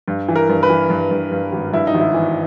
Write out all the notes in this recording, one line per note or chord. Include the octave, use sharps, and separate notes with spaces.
G2
E3
A#4
G2
B4
E3
G2
G2
G2
G#1
G2 E4
D#4
G#1
E4
E3